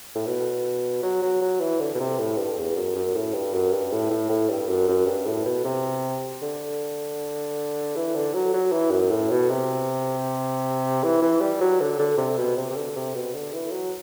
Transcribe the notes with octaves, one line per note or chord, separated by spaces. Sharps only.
A2
B2
F#3
F#3
F#3
E3
D3
B2
C3
A2
G2
E2
F#2
F#2
A2
G2
F#2
G2
A2
A2
A2
G2
F#2
F#2
G2
A2
B2
C3
D3
E3
D3
F#3
F#3
E3
F#2
A2
B2
C3
E3
E3
G3
F#3
D3
D3
C3
B2
C3
C3
D3
C3
B2
D3
E3
F#3